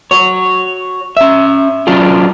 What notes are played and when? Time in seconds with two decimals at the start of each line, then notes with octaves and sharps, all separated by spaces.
0.11 F#4 C#5
1.17 C#4 E5
1.87 F#3 C#4 D4 F4 G#4